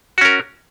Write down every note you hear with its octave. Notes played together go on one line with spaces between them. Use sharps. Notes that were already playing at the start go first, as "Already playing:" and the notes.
C#4 F#4 A#4